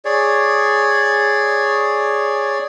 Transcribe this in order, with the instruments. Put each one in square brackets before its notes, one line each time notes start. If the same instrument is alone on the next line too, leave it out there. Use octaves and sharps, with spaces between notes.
[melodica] G#4 C#5 D5